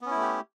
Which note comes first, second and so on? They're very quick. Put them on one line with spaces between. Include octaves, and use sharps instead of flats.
B3 C#4 E4 A3 G4